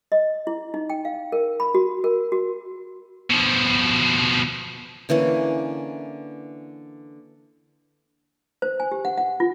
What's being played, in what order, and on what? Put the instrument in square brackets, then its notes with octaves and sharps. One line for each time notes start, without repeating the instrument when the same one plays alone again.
[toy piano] D#5
E4
D#4
G5
F5
A#4
B5
F#4
A#4
F#4
[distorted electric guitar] B2 F3
[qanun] D3 E3 A#3 C#4
[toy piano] C5
G#5
G4
F#5
F#5
F4